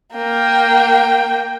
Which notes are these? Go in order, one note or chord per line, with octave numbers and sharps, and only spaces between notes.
A#3 G5